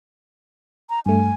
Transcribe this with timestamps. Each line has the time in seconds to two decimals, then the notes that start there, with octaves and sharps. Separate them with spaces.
0.90 A#5
1.06 G2 A3 G#5